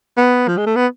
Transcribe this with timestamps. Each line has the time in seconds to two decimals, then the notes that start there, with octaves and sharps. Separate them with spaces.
0.17 B3
0.48 F3
0.57 G#3
0.66 A3
0.76 B3